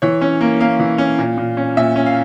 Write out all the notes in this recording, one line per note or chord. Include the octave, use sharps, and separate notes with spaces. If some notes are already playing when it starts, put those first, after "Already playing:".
E3 C#5
C#4
A#3
A#3 F5
E3
C#4
A#2
A#2
C#4
A#2 E5
C#4
F5